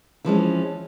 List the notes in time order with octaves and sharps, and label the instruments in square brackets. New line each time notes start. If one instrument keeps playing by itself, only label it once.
[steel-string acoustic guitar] E3 F3 G#3 C#4